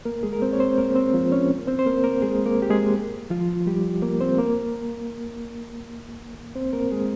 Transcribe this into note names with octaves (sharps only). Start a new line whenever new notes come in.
A#3 A#4
G#3 G#4
A#4
C4 C5
C#5
C4 C5
A#3 A#4
C4 C5
F3 F4
C#4 C#5
C4 C5
C5
A#3 A#4
A#3 A#4
G#3 G#4
A#3 A#4
G4
G#3 G#4
F3 F4
G3 G4
A#3 A#4
C4 C5
A#3 A#4
C4 C5
A#3 A#4
G#3 G#4